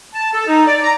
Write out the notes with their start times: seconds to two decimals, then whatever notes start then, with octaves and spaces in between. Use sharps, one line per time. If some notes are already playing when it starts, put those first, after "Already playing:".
0.14 A5
0.33 A4
0.47 D#4
0.66 D5
0.83 A#5